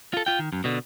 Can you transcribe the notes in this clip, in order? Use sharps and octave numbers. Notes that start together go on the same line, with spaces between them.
F4 A4
F4 G5
D#3
F#2
B2 D3